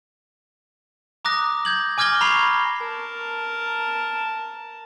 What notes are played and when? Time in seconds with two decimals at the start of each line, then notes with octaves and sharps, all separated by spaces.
1.25 A#5 D6 D#6 F#6 A#6
1.65 G6 G#6 F#7
1.98 G#5 D6 F6 G#6 A#6 G7
2.21 A#5 B5 C#6 C7 F7
2.80 A#4 A5